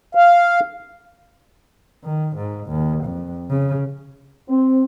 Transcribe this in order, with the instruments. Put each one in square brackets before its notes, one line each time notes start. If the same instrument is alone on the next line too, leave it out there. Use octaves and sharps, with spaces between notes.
[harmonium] F5
[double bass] D#3
G#2
D#2
F2
C#3
[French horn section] C4